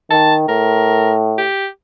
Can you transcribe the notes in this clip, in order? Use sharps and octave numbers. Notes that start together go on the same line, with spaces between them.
D#3 A5
A2 A#4
G4